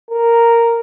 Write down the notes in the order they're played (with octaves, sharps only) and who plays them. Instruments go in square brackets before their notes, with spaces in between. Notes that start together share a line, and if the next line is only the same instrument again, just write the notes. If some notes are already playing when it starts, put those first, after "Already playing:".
[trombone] A#4